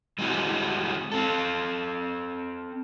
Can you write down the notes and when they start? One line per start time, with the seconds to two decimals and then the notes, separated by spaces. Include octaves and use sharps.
0.19 G3 G#3 C4 E4 F#4 G#4
1.12 C4 A4